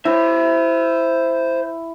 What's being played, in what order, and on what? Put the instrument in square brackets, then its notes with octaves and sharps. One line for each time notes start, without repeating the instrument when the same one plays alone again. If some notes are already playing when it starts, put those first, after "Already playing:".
[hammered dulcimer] E4 [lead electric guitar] C5 E5